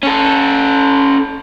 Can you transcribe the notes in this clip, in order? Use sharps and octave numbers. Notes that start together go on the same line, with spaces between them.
C#4 A4